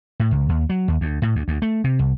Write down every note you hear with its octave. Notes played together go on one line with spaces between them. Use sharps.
A2
C#2
D#2
F#3
D#2
D2
A2
D2
D2
A3
C3
C2